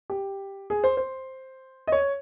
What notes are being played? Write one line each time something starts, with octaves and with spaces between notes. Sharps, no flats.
G4
G#4
C5
C5
D#5
C#5